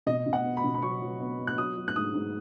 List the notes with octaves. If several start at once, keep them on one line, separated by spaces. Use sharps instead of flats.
B2 D#5
B2
F#5
B3
B5
B2
B5
F#3 C#6
F#3
B3
B3
F#6
F#3 D#6
F#3
F#6
G#2 D#6
G#2